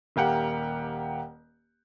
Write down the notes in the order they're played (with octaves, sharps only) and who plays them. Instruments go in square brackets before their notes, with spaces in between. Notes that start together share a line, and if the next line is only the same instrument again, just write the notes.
[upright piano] D#1 A#3 G4 F#5